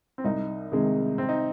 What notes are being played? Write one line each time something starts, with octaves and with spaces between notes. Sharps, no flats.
C4
C2 D#4
C3 D#3 G#3
C3 C4
D#4